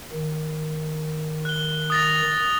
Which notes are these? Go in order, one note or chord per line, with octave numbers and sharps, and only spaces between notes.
D#3
F#6 G7
D#6 A6 A#6